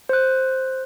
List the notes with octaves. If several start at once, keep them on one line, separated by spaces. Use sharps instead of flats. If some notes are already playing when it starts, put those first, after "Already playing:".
C5 F#6